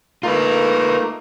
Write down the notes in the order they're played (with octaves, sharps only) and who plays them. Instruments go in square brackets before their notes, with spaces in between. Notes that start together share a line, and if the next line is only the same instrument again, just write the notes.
[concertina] A3 A#3 D#4 [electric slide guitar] F4 B4 [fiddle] A#4